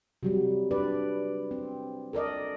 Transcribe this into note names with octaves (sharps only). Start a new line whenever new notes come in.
C3 F#3 G3
D4 B4 D5
C4
A4 A#4 D5 D#5